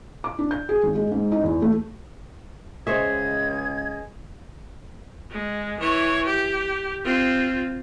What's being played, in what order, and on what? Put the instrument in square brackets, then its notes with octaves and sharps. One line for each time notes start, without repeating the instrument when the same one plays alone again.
[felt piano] D6
D4
G6
G#4
G#1
G#3
G#2
D#4
E2
A3
[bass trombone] C#2 [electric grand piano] G#4 D#5 [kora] C5 C#5 E5 [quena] G#6
[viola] G#3
E3 C#5
G4
C4 F4